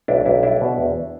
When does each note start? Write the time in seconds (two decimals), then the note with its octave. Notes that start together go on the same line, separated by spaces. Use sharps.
0.08 B1 D4 E4
0.25 B1 D4 E4
0.43 G3 D4 E4
0.61 B2
0.78 E2